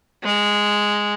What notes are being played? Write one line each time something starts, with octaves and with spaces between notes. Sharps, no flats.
G#3